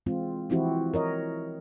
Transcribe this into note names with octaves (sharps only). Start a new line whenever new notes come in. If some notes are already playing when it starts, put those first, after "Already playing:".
E3 G#3 C4 F4
E3 F3 C4 E4 F#4 G4
A#4 C#5 D#5